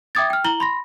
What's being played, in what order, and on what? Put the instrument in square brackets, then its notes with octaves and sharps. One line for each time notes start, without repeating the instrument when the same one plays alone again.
[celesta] E5 G5 D6 D#6 G#6 A6
G5 F6
E4 A#5 F#7 G7
B5 C6 A#6